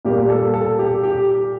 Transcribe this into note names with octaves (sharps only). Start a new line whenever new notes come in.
A#2 G3 A#3 G4
A4
A4
G4
G4